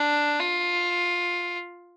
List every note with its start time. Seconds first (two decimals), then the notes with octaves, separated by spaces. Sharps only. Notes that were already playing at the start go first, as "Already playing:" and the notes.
Already playing: D4
0.39 F4